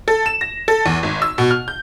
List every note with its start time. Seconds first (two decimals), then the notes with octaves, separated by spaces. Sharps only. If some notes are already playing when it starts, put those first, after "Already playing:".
0.08 A4
0.26 E7
0.41 A#6
0.68 A4
0.86 E2
1.03 G#1
1.22 E6
1.38 B2
1.51 F6
1.68 G6